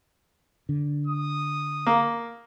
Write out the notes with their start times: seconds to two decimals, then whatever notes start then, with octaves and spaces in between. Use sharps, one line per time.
0.69 D3
1.07 D#6
1.86 A#3